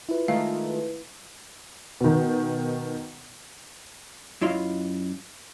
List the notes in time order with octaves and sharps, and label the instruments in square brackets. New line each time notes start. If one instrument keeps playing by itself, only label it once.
[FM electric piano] E4 B4 [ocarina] F4
[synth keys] D#3 G#3 A3 [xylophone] F5
[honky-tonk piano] B2 D#3
[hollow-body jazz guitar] F#2 E4 F4 D#5 F5